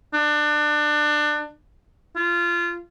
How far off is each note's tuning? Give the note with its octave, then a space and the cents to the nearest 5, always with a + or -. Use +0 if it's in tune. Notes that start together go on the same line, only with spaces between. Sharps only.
D4 +25
F4 -20